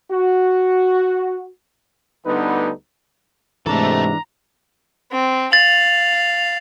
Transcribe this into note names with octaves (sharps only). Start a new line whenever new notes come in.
F#4
D2 D3 G3 B3 D#4 B4
G#2 C3 E3 A3 D4 A4 A#5
C4
F5 A6 F#7